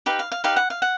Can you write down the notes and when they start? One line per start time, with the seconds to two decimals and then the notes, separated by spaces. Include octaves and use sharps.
0.06 D#4 G4 B4 F5
0.19 F5
0.32 F5
0.44 D#4 G4 B4 F5
0.56 F#5
0.70 F5
0.82 F#5